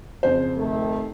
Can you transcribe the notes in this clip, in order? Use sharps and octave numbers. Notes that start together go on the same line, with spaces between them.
F2 C#3 C5
C3 D#3 A3